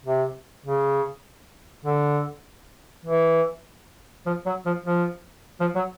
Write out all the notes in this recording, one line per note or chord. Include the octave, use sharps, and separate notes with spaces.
C3
C#3
D3
E3
F3
F#3
F3
F3
F3
F#3